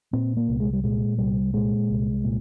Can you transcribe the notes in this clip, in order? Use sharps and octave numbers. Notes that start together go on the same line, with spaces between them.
A#2 C4
A#3
C2
G#3
G3
A#2 G#3
C2 G3
A#2 G#3
C2
A#2